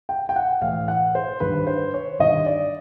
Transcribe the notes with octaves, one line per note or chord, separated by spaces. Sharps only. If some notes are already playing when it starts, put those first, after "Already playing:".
G5
G5
F#5
A2 E3 F5
F#5
C5
G2 D#3 B4
C5
C#5
G2 D#3 D#5
D5